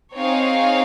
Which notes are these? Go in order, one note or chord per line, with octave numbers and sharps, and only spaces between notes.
C4 D#4 G#4 C#5 F5